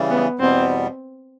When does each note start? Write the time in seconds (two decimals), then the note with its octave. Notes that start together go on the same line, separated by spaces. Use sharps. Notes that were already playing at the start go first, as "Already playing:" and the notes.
Already playing: C#3 E3 G3
0.10 B3
0.39 E2 B2 G3 B3 C4